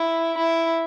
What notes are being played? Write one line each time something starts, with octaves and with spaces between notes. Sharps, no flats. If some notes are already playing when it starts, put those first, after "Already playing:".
Already playing: E4
E4